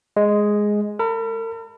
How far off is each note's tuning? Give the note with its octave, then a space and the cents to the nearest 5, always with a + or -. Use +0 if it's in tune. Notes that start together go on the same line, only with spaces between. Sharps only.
G#3 +0 D#5 +0
A#4 -45 B5 -5